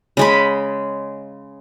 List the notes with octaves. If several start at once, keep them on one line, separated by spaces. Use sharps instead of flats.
C#3 G#3 B5